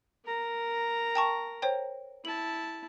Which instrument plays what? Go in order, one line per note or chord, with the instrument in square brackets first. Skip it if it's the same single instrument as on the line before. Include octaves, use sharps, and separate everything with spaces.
[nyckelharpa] A#4 A#5
[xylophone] G5 A5 C#6
C5 C#5 G5
[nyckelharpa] E4 A5 [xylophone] F#7